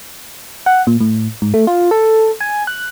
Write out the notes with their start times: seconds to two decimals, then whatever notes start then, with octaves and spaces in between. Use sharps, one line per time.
0.66 F#5
0.87 A#2
1.01 A2
1.42 G#2
1.54 A3
1.67 F4
1.91 A4
2.41 G#5
2.67 F#6